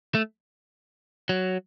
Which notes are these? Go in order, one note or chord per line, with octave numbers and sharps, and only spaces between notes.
A3
F#3